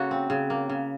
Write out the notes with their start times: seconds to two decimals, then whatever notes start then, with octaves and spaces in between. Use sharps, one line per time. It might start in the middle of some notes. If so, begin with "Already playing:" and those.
Already playing: C#3 A#3 F#4 A4
0.11 C4
0.30 C#3
0.50 A#3
0.70 C#3